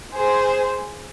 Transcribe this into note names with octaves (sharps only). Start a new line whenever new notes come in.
G#4 C5